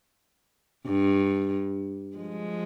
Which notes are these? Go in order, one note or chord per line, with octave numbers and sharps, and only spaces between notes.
G2
F3 G#3